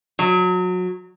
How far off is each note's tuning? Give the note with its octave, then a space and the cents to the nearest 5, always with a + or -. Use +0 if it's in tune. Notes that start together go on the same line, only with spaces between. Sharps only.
F#3 -25